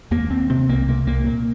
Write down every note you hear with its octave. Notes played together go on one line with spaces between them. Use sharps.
D#2 A#3
D#2 C4
C3 C4
C2 A#3
C3 A#3
C2 A#3
A#2